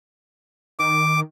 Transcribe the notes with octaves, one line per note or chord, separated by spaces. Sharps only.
D#3 D6